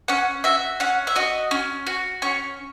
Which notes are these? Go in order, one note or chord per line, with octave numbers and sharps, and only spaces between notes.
C#4 F#5
F#4 E5
C#4 F#5
E5
F#4 D#5
C#4
F#4
C#4 C#5